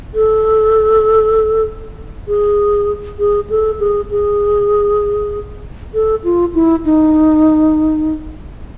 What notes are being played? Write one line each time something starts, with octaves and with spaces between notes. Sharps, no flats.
A4
G#4
G#4
A4
G#4
G#4
A4
F4
E4
D#4